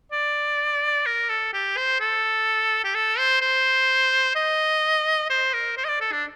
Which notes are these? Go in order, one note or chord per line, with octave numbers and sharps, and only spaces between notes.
D5
A#4
A4
G4
C5
A4
G4
A4
C5
C5
D#5
C5
A#4
C5
D#5
D5
A4
D4